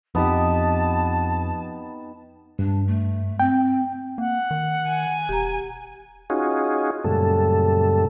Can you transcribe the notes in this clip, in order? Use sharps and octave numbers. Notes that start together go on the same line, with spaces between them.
F2 B3 D#4 G4 A5
G2 D4
A3
C4 G5
A#3 F#5
D#3
G#5
E1 G4 A#5
C#4 D#4 F4 F#4 G#4
F#2 A#2 C#3 G3 A3 A4